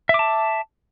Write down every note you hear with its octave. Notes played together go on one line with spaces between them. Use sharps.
E5 A5 D6